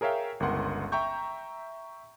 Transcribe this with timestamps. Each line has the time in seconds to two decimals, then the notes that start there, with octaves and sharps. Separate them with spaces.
0.01 G#4 A#4 C#5 E5 F5 G5
0.40 G1 C#2 A#4 F#5 C6
0.92 E5 G5 A#5 C#6 G6